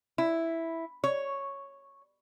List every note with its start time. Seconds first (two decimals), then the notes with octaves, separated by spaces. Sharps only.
0.18 E4
1.04 C#5